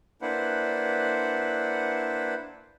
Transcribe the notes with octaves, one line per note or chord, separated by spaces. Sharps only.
A#3 D4 E4 B4 C5 F#5